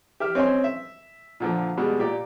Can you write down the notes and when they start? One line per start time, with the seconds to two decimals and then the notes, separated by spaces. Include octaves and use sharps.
0.20 G4 E5 F6
0.35 C4 C#4 D#5 G#5 C6
0.64 E5
1.40 A#2 D3 F3
1.77 B2 G3 G#3
1.99 A#2 G4 D5